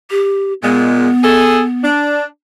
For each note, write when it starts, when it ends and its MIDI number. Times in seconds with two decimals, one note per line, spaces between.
0.11 0.53 67
0.62 1.08 46
0.62 1.08 56
0.62 1.86 59
1.24 1.61 68
1.24 1.61 69
1.83 2.25 62